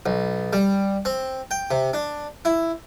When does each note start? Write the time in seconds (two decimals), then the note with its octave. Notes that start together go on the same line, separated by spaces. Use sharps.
0.06 B1
0.53 G3
1.05 C4
1.51 G5
1.71 C3
1.94 D4
2.45 E4